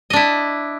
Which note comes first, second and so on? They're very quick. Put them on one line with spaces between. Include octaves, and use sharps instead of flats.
D#5 D4 E4